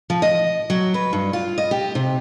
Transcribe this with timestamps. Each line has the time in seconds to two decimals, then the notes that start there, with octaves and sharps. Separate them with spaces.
0.10 F3
0.22 D#5
0.70 F#3
0.94 B4
1.13 G2
1.33 F4
1.58 D#5
1.71 G4
1.95 C3